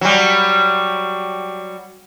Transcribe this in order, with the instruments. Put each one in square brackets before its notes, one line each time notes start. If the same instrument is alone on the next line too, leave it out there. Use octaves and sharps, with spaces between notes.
[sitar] F#3 G3